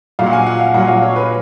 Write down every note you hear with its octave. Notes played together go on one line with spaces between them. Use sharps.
A#2 F#3 F5
F#5
G#5
F#5
F5
A#2 F#3 F#5
F5
C#5
B4